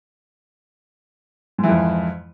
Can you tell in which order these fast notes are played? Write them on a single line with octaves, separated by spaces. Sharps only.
G#2 E3 F2